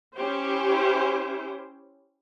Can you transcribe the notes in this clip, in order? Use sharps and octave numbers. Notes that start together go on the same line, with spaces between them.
C#4 E4 G4 C5